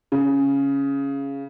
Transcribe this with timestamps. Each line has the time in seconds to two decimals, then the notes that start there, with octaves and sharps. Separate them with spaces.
0.12 C#3